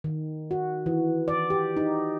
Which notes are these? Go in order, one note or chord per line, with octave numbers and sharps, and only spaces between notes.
D#3
F#4
E3
D5
G4
D#4